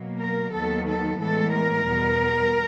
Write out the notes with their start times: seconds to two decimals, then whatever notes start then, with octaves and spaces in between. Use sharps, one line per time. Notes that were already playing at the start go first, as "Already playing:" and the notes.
Already playing: B2 F#3 A#3
0.18 A#4
0.52 D#2 D#3 F#3 B3 A4
0.85 A4
1.18 A2 E3 G#3 B3 A4
1.52 A#4
1.85 E2 B2 G3 B3